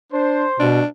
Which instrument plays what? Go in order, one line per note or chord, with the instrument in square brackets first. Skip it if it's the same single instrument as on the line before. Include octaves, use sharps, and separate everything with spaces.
[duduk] D4 [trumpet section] C5
[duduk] B2 [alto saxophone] D4